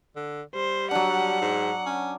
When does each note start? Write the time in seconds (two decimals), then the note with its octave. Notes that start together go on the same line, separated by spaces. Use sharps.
0.16 D3
0.55 G3 C5
0.91 F#3 D4 F#5
1.41 G#2
1.86 C#4